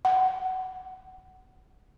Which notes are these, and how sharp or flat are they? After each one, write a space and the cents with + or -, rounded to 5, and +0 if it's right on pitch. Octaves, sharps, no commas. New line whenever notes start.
F#5 +20